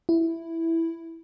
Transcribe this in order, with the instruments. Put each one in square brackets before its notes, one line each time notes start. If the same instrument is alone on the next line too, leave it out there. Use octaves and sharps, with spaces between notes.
[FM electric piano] E4